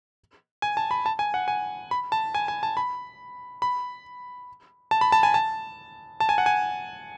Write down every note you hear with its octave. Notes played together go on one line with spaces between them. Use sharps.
G#5
A5
B5
A5
G#5
F#5
G#5
B5
A5
G#5
G#5
A5
B5
B5
A5
B5
A5
G#5
A5
A5
G#5
F#5
G#5